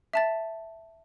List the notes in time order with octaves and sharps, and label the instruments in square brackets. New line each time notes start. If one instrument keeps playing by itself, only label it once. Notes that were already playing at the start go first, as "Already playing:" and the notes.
[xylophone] E5 A5 A6